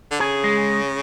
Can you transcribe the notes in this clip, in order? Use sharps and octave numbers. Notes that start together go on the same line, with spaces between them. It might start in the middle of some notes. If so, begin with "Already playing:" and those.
D3
C#3 G#4
G#3